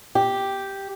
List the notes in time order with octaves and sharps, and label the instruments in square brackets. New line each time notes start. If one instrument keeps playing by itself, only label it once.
[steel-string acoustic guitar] G4